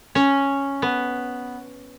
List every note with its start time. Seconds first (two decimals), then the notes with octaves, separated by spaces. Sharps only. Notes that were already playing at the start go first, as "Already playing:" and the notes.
0.15 C#4
0.82 B3